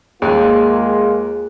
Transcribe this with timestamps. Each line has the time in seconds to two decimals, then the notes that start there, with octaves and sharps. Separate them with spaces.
0.22 D#2 G#3 A#3 F4 G#4 F#6